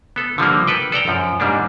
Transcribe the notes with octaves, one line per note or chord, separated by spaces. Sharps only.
B3 A4
D3 F3 G3 A#3
A4 B4 G5
A4 D5 G5 A#5
F#2 F3
G#2 G3 A#3 D4